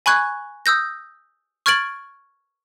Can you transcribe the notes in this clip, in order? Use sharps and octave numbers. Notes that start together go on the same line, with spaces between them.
G#5 B5 C#6 F#6 G#6
D#6 E6 G6 A#6
C#6 F6 G#6 A6 D7 F#7